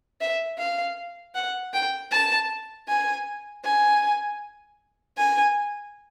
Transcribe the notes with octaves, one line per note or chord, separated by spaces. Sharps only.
E5
F5
F#5
G5
A5
G#5
G#5
G#5